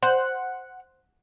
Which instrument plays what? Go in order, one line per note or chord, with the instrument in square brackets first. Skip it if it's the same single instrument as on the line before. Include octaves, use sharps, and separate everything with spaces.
[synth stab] C5 [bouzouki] F#5